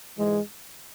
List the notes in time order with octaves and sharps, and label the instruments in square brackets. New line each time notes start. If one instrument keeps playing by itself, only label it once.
[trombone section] G#2 E3 G#3